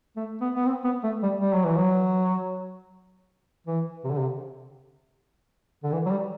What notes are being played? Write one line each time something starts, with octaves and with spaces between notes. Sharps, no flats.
A3
B3
B3
C4
B3
A3
G3
G3
F#3
E3
F#3
E3
C3
D3
C3
D3
E3
F#3
G3